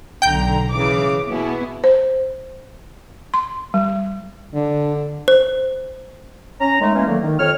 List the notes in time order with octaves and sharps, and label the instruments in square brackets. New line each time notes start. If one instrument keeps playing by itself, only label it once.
[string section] B1 D3 A#5 [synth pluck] G5 G6
[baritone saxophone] C#3 [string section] E3 D6
[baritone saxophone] B2 [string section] B3 E4 G#4
[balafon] C5
C6
G3
[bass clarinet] D3 [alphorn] D4
[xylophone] C5
[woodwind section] C#4 A#5
D#3 G#3 A3
E3 G#3 A#3 C#4
D3 D#3 F#3 A3 A#3
D#3
F2 C4 C#5 F6